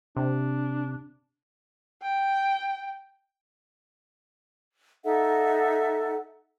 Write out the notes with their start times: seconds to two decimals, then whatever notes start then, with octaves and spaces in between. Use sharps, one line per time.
0.17 C3 D4
2.02 G5
5.05 D#4 A4 E5 F#5